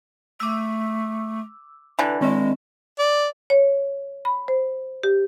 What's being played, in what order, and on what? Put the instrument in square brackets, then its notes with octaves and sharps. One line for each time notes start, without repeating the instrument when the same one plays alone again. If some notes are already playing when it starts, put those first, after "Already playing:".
[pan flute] A3 [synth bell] D6 E6
[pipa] D3 E3 [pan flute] B4
[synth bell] D#3 C4 D#5 [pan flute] G#3
[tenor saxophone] D5
[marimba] C#5
B5
C5
G4